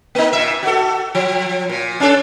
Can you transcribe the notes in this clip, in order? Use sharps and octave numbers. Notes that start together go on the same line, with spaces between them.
A#3 D#4
A#2 E5
F#4 A4
F3
A#2
C#4 D4 A4